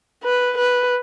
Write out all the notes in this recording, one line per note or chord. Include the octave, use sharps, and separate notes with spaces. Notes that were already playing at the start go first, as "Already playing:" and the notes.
B4
B4